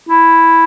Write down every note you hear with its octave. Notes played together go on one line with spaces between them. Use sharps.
E4